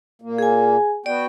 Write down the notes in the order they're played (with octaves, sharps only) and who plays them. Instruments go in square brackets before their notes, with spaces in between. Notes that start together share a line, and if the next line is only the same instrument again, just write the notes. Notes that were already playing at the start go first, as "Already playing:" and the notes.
[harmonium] A#2 A#3
[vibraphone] G#4 G#5
[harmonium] B3 F#4 G5 [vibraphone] D5